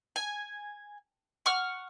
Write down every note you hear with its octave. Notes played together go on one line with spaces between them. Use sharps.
G#5
F#5 C#6 F6